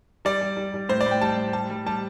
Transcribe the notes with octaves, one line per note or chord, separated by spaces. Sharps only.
G3 D5
G3
G3
G3
A2 C5
D5
A2 G5
G3 A5
A2
G3 A5
G3
G3 A5